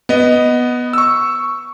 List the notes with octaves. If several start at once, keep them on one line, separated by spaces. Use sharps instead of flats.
B3 D#5
C#6 E6